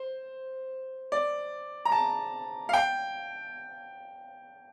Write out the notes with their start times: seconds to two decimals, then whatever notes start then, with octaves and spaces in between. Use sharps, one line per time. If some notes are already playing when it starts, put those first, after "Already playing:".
Already playing: C5
1.12 D5
1.85 A#5
1.92 A5
2.69 F5
2.73 G5